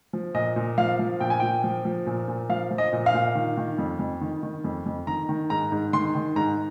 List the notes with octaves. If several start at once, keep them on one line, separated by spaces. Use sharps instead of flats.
F3
A#2 D#5
A#2
F3 F5
F3
A#2 G5
G#5
A#2 G5
F3
F3
A#2
A#2
F3 F5
F3
D#5
A#2
F5
A#2
D#3
D#3
F2
F2
D#3
D#3
F2
F2
D#3 A#5
D#3
G#2 A#5
G#2
D#3 C6
D#3
G#2 A#5